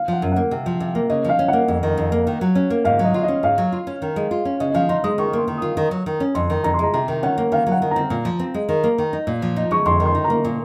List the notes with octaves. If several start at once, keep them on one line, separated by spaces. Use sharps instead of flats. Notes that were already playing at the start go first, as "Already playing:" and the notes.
Already playing: F5
F3 F#5
F#2
A#3 F#5
C3
F3
C3
A#3
C#3 D#5
F3 F5
C#4
A#3 F#5
F2
D#3
F2
A#3
D#3
F#3
C#4
A#3
G#2 F5
F#3
D#5
F4
D#5
C#4
G#2 F5
F#3
F4
C#4
D#3
G#3
F4
C#4
C#3 D#5
D#5
F3 F5
D#4 C6
G#3 D#6
D#3 C#6
A#3 C6
D#3
F4 D#6
D#3
F#3
D#3
C#4
F2 C6
D#3
F2 A#5
C6
G#3 A#5
C3 A#5
D#3
C#4 F#5
A#3
D#3 F5
F#3 F#5
D#3
A#5
C4
A#2
F3
C4
G#3
D#3
A#3
D#3
D#4
A#2
F3
D#4
G#3 C#6
F2 C6
D#3
C6
D#4
A#5
A#3
A#2